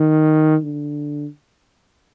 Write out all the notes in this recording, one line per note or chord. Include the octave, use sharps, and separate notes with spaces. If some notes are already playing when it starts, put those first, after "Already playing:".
Already playing: D#3
D3